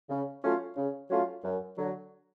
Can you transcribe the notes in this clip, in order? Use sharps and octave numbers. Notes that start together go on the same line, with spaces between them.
C#3
F#3 A3 C#4 F4
C#3
F#3 A3 C#4 F4
F#2
D3 F#3